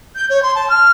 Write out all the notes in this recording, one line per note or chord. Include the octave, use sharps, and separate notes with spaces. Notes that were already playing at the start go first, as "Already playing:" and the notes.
G6
C#5
C6
A5
F6